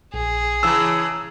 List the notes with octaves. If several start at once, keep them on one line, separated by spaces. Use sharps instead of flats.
A#1 G#4
C#3 E3 A5 A#5 E6